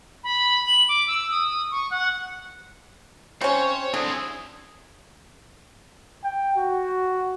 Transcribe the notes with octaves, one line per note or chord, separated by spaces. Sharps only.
B5
F#7
D6
E6
D#6
C#6
F#5
C3 C#4 C5 C#5
D3 C4 E4 G#4
G5
F#4